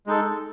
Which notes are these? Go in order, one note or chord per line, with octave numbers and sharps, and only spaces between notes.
G#3 D#4 A4